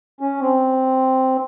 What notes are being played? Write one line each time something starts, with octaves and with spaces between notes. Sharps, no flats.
C#4
C4